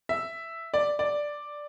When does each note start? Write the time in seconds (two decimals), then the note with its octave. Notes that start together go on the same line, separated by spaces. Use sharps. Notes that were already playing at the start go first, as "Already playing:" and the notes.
0.09 E5
0.74 D5
0.99 D5